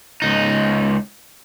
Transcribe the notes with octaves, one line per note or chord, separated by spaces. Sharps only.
C#2 D#4